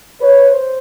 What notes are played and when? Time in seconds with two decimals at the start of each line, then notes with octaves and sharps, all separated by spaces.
0.21 B4 C#5
0.50 C5